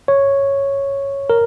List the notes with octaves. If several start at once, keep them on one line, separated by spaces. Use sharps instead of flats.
C#5
A#4